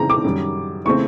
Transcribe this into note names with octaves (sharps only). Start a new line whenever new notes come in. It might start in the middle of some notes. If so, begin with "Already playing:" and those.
Already playing: C#3 E3 G#3 C4 A#5
D6
F#2 D#3 G3
C#3 E3 A3 C4 C#6